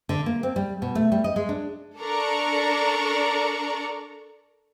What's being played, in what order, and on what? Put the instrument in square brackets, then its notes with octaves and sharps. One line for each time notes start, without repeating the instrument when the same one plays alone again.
[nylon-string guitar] D3
A#3
C4
G3
B2
A3
G3
D#5
G#3
D4
[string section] D4 A4 A#4 D5 A#5 C#6